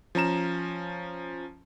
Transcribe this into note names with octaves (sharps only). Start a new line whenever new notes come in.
F3 C#4 A#5 E7